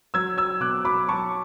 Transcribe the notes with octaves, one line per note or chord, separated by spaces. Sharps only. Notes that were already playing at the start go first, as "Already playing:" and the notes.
F#3 E6 G#6
F#3 E6 G#6
B2 D6 F#6
F#3 B5 D6
F#3 A5 C#6